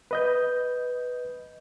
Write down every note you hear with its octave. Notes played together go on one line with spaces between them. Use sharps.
B4 D#5 G6